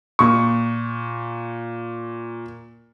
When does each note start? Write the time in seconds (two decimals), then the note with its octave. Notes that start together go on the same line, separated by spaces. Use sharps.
0.19 A#2 C#6